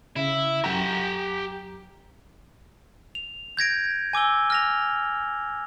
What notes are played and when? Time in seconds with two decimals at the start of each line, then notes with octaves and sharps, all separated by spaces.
0.16 C#3 E4
0.64 F#2 G4 F#5 A#5
3.15 F7
3.57 G6 G#6 A#6 D7
4.13 G#5 D6 E6 G7
4.50 F6 A#6 F7